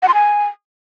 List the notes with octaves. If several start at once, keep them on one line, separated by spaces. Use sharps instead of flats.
F#5
C6
G#5